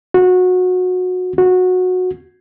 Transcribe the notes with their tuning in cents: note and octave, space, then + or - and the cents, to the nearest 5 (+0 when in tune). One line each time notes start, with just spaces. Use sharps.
F#4 -20
F#4 -15